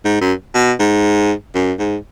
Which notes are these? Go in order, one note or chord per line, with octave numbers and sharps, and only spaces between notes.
G#2
F#2
B2
G#2
F#2
G#2